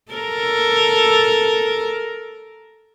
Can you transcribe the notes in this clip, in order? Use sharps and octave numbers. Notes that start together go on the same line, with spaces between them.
A4 A#4